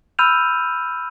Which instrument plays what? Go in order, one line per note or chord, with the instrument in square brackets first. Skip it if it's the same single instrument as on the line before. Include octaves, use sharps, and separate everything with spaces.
[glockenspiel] B5 E6 F6 G6 D#7 F7